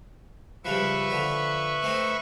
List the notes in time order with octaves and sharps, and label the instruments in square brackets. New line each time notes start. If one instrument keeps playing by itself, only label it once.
[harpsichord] G2 C#3 F3 [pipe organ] B4 E5 C#6
[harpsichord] D3 F3
A3 C4 D#4